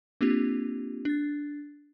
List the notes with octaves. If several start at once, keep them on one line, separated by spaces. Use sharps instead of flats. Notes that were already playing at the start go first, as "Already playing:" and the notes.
A#3 C4 D4 F4 G4
D4 A6